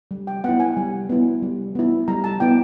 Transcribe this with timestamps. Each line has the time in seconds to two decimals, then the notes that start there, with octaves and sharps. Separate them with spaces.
0.11 G3
0.27 G5
0.44 B3 E4 F#5
0.60 G#5
0.77 G3
1.09 B3 E4
1.42 G3
1.75 B3 E4
2.08 G3 A#5
2.24 A5
2.40 B3 E4 G5